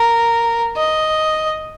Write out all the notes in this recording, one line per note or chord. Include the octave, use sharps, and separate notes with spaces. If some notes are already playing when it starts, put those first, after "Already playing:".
Already playing: A#4
D#5